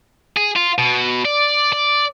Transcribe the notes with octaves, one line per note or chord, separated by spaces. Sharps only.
G#4
F4
B2
D5
D5